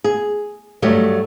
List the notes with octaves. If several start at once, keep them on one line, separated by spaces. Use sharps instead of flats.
G#4
G2 F#3 G3 A3 G4 D#5